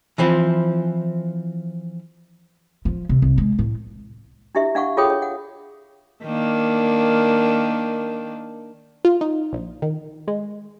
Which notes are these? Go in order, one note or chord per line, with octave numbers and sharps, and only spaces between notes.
E3 F3 C4 E4
F3
C3
C2
G#3
A2
D4 E4 G4 E5
D4 F5 F#5 C#6
F4 G#4 A4 C#5 G5 D#6
C#5
F#5
D#3 A#3 D4
F4
D#4
A#1
D#3
G#3